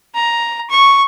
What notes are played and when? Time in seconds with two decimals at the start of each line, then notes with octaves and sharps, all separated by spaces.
0.15 A#5
0.70 C#6